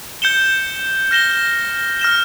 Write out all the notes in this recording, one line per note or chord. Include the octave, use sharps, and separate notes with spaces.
G6 C#7 E7 G7
F6 A#6 E7 G7
F6 A#6 E7 G7